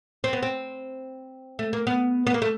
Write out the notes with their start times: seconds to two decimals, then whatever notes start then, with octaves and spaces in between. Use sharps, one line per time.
0.24 C4
0.33 B3
0.43 C4
1.59 A3
1.73 A#3
1.87 B3
2.27 B3
2.34 A#3
2.42 A3